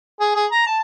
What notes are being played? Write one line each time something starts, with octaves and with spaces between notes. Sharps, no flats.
G#4
G#4
A#5
A5